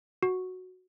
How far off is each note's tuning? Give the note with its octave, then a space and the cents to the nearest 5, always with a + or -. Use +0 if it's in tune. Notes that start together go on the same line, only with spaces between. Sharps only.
F#4 -5